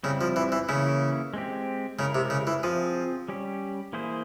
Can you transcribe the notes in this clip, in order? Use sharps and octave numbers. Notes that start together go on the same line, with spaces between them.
C#3 G3 C4 E4
F3
E3
E3
C#3 E3 A#3 C#4 E4
G#3 C4 G4
C#3 G#3 E4 A#4
C3
C#3
E3
F3 C4 F4 G#4
G3 C#4 G4
E3 A#3 E4 G#4 C5